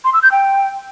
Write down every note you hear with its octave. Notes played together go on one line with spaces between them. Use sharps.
C6
E6
G6
G5